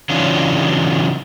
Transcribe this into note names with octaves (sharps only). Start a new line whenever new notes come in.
C#3 E3 F#3 D4 D#4 F4